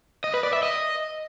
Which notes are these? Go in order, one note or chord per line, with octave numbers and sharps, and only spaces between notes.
D#5
B4
D5
E5
D#5